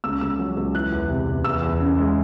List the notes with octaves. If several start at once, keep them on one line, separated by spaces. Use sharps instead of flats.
C#2 E6
C#2 E6
F#3
C#2
E3 F#6
E2
C3
E2
E2 E6
E2
C#3
G#3